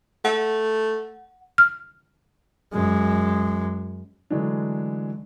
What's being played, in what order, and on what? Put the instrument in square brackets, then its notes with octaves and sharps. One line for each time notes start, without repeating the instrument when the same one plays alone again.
[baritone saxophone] A3 [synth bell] F#5
[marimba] F6
[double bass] F#2 G#3
[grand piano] D3 E3 F#3 G#3 A3 D4